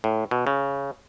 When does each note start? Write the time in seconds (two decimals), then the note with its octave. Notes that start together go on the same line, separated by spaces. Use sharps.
0.04 A2
0.31 B2
0.47 C#3